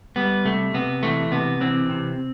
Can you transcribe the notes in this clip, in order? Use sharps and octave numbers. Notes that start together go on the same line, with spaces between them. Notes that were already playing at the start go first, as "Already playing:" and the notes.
G3 B3
C3 A3
C3 B3
E3 A3
C3 B3
E3 C4
C3